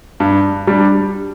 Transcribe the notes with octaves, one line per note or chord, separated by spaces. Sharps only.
G2
G3 D4